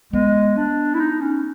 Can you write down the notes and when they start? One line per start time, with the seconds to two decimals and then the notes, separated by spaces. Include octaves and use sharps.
0.13 G#3 B3
0.57 D4
0.94 E4
1.00 D#4
1.21 C#4